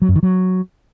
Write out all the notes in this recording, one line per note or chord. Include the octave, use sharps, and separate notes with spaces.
F#3
F#2
D#3
F#3